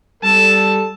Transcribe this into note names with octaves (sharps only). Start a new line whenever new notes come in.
G3 A4 A5